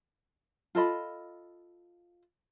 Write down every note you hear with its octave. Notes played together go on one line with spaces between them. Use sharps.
F4 A4 D#5 B5